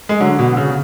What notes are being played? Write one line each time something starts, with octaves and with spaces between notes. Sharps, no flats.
G#3
D3 F#3
B2
D3
C#3